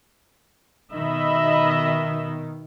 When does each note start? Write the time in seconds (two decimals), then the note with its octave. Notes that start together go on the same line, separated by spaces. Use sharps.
0.93 B2 D#3 D#5 E5 B5